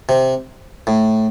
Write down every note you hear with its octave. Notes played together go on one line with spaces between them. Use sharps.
C3
A2